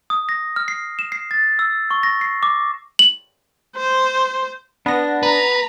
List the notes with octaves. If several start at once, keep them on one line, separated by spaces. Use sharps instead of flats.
D#6
A#6
F6
C7
E7
C7
A6
E6
C#6
A#6
C7
D6
F#7
C5
B3 D4 A#6
B4 A#5